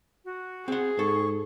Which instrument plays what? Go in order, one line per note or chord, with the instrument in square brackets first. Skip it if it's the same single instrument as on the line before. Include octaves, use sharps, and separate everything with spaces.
[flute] F#4
[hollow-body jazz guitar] C4 F#5 [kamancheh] G#4
[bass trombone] G#2 [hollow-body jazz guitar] A4 [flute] C#6